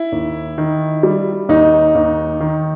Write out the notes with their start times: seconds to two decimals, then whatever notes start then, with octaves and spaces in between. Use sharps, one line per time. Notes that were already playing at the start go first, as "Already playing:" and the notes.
Already playing: E4
0.12 D#2
0.58 D#3
1.03 G3
1.49 D#2 D#4
1.95 D#2
2.40 D#3